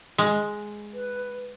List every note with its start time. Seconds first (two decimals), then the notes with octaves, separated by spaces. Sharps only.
0.18 G#3
0.94 B4